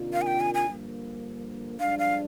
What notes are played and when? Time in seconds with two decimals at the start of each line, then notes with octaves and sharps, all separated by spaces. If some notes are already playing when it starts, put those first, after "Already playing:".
Already playing: C3 D#3 A#3 D4 F4
0.13 F5
0.22 G#5
0.27 G5
0.41 G#5
0.54 G#5
0.69 G2 D3 F3 A#3
1.80 G2 F3 G#3 D4 F5
1.99 F5